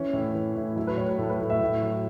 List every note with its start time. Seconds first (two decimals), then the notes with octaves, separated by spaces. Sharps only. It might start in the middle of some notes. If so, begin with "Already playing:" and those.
Already playing: E3 C#4
0.13 A2 E4
0.34 E3
0.55 A2 E4
0.76 F#3 E4
0.87 B4
0.97 A2 C#5
1.09 B4
1.18 A2 A4
1.30 B4
1.40 A2
1.50 E5
1.61 A2
1.82 F#3